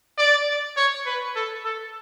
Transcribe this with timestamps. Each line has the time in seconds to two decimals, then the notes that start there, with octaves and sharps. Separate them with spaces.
0.18 D5
0.77 C#5
1.06 B4
1.36 A4
1.64 A4